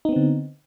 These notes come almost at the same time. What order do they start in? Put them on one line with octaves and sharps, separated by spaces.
D#4 B3 C4 D3